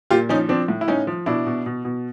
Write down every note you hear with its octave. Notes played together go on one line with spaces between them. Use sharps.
A#2 F4 G4
F3 C#4 D#4
F3 C4 D4
A2
E4
A2 C#4 D#4
F3
B2 D4 E4
B2
B2
B2